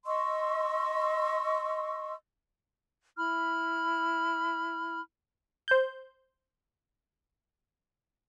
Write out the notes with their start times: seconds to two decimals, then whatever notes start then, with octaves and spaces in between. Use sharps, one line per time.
0.06 D#5 C6 C#6 E6
3.17 E4 B5 F6
5.68 C5 G6